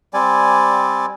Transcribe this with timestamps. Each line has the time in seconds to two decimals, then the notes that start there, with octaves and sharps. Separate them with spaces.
0.14 G3 C4 D5 G#5